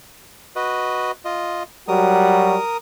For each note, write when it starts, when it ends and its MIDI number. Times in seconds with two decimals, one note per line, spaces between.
0.56 1.12 66
0.56 1.12 71
0.56 1.12 75
1.25 1.63 65
1.25 1.63 75
1.88 2.57 54
1.88 2.57 55
1.88 2.57 66
1.88 2.77 70
1.88 2.77 87